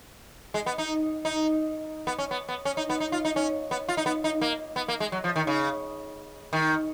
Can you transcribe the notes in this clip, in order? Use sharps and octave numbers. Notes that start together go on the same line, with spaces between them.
G#3
B3
D#4
D#4
B3
C#4
B3
B3
C#4
D#4
B3
D#4
F4
D#4
C#4
B3
F4
D#4
B3
D#4
A#3
B3
A#3
G#3
F#3
F3
D#3
C#3
D#3